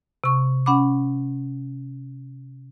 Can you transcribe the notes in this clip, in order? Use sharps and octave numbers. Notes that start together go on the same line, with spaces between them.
C3 C#6
C#4 F#5 B5 D6